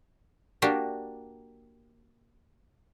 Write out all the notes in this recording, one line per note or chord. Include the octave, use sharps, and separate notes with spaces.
A#3 D4 F#4 G4